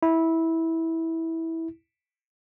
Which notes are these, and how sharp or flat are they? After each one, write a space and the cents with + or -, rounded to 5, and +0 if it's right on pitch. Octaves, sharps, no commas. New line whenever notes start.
E4 -15